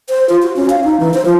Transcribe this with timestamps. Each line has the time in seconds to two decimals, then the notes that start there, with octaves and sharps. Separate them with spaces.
0.09 C5
0.29 F4
0.42 F#4
0.56 C#4
0.70 F5
0.84 D#4
1.00 E3
1.14 C5
1.26 F3